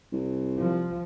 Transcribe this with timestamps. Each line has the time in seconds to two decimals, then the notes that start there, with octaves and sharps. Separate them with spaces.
0.13 C2
0.58 F3